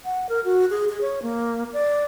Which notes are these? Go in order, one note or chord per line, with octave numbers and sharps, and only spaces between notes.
F#5
A#4
F#4
G#4
G#4
C#5
A#3
D5